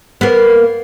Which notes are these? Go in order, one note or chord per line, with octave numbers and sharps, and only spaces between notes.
A#3 B3